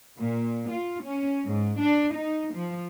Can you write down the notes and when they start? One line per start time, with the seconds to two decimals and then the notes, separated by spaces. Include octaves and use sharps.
0.18 A#2
0.71 F4
1.04 C#4
1.45 G#2
1.79 D4
2.14 D#4
2.53 F3